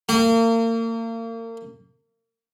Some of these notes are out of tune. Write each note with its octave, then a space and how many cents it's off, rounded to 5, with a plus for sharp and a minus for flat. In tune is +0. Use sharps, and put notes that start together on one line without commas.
A#3 -35